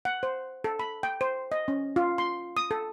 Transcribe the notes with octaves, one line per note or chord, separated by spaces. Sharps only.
F#5
C5
A4
B5
G5
C5
D#5
C#4
F4
C6
D#6
A4